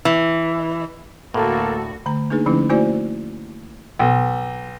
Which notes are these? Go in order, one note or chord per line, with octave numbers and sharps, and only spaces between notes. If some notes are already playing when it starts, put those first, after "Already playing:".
E3
D2 A2 A#3 F#4 A4
D3 A3 A#5
A#3 D4 D#4 G#4 B4
D3 F3 A3 C#4 D#4 E4
A3 A#3 E4 F#4 C5 D5
B1